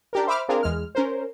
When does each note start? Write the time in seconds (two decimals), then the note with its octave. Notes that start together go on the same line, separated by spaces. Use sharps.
0.13 D4 G4 A#4
0.27 C5 E5 B5 D6 F6
0.48 C4 D4 F4 G#4 A#4
0.63 E2 G#3 F6
0.95 C#4 A#4 C5